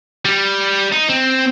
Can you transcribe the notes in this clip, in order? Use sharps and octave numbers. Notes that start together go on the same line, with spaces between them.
G3
D#4
C4